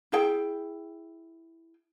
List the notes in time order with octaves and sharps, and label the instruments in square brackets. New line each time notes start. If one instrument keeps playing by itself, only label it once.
[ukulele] E4 G#4 G5